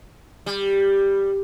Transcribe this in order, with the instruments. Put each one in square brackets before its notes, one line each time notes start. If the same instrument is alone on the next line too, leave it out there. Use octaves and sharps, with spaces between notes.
[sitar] G3